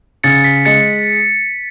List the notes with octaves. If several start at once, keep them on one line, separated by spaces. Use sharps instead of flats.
C#3 A6 C#7
B6
G#3 A6 C#7